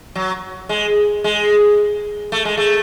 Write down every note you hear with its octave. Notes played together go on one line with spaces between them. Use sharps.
F#3
G#3
G#3
A3
G#3
A3